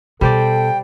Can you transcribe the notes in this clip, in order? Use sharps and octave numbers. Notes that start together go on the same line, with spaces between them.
B2 G3 A4 C5 D5 G5